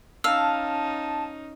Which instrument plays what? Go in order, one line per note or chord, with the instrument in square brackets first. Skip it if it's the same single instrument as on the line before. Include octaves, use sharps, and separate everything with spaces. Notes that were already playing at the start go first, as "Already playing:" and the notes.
[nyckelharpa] C#4 D#4 [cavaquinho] F5 [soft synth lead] A5 [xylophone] E6